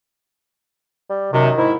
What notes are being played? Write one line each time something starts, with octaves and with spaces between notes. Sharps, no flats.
G3
F#2 C3 D#3
G#2 E4